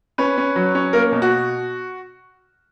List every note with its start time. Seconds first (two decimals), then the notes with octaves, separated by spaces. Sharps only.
0.18 C#4 B4
0.38 C#4
0.56 F#3
0.75 C#4
0.93 A#3 A#4
1.12 B2
1.22 F#4